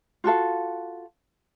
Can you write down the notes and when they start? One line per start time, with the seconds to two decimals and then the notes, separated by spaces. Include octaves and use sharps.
0.24 F4 F#4 A4 F5